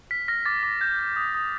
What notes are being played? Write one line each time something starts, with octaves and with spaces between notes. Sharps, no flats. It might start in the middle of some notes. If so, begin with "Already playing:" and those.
F6 B6
F6 A#6
D6 A6
D6
G6
G6
D#6
D#6